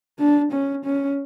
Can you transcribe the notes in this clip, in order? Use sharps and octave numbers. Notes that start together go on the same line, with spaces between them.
D4
C#4
C#4